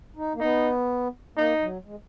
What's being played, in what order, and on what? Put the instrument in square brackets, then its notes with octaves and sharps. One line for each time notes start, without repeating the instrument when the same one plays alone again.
[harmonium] D#4
A#3
[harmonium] B3 [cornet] D#4
[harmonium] A#3 [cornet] D#4
[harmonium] F#3
G#3